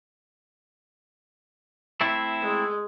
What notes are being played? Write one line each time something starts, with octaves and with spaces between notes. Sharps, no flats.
A3 C4 E4
G#3